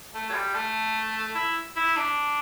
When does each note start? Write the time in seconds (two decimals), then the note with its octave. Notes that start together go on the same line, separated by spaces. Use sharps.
0.14 A3
0.29 F#3
0.34 G3
0.55 A3
1.35 E4
1.76 E4
1.96 D4